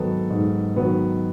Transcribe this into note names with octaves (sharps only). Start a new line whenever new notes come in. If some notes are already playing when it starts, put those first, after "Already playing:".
Already playing: G#2 D#3 F#3 B3 A4
G#2
D#3 F#3 B3